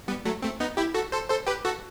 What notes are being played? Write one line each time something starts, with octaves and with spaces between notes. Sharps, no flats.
G3 B3
F#3 A3
A3 C4
B3 D#4
E4 G4
F#4 A4
A4 C5
A4 C5
G4 B4
F#4 A4